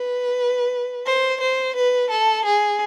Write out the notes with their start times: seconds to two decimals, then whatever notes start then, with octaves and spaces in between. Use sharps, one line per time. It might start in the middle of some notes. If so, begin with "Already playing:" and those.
Already playing: B4
1.06 C5
1.41 C5
1.76 B4
2.10 A4
2.45 G#4